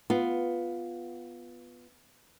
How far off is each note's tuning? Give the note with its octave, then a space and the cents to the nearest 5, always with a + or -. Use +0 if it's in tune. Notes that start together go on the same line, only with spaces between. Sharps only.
B3 +0 F4 +0